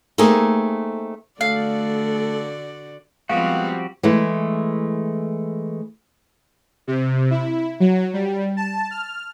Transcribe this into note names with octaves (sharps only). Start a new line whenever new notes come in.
A3 A#3 C4 D#4 G#4
D3 A3 F#4 A4 D5 F5
F3 G3 G#3 B3 C4 F#4 G4 F5
E3 G#3 A3
C3
E4
F#3
G3
A5
F6